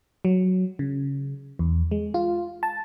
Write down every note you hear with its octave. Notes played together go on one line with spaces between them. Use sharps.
F#3
C#3
E2
G#3
F4
A5